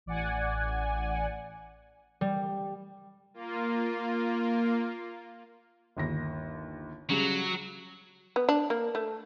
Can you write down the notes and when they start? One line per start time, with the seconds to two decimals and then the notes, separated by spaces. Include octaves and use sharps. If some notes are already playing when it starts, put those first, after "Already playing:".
0.06 A1 D5 F#5 G#5
2.21 G3
3.34 A#3 F4
5.97 G1 D#2 A#6
7.10 C#3 F#3 G3
8.36 B3
8.49 D4
8.70 A#3
8.95 A3